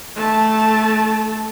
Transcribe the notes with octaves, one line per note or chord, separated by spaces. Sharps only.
A3 A5